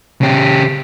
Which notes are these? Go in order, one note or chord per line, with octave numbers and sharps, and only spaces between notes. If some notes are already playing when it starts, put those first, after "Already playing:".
C#3 G4